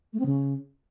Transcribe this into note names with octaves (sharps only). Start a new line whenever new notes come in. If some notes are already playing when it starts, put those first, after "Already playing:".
A3
C4
C#3